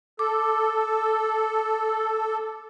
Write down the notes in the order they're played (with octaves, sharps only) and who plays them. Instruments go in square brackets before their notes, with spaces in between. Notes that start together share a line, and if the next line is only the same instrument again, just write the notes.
[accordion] A4 [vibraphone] D6